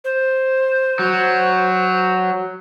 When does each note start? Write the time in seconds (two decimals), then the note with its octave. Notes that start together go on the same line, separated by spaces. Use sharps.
0.04 C5
0.99 F#3